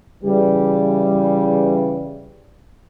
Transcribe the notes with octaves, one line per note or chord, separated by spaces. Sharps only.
C#3 E3 G3